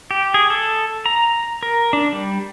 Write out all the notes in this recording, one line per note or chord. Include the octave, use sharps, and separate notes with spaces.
G4
G#4
A4
A#5
A#4
D4
G3